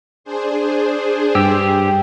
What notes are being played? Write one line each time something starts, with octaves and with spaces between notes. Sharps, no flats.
D4 G#4 C5
G2 G4 E6